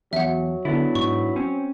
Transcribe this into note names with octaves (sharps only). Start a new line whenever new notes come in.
E2 F#3 E5 F#5
D3 B3 D4 E4
G#2 C#6
C4 C#4